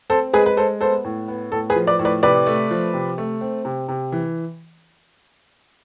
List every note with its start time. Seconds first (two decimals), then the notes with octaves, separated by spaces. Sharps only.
0.10 C4 A4 C5
0.33 G#3 G#4 B4
0.46 B4
0.57 G#3 A4 C5
0.81 B3 A4 C5
1.05 A2
1.28 B3
1.52 A2 A4
1.70 G#4 B4
1.75 F3
1.87 B4 D5
1.99 A2
2.05 B4 D5
2.23 C3 B4 D5
2.47 A3
2.70 F3
2.94 C3
3.18 A3
3.41 C4
3.65 C3
3.89 C3
4.12 E3